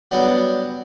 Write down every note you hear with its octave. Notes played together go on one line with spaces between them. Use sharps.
F#3 G3 B3 D4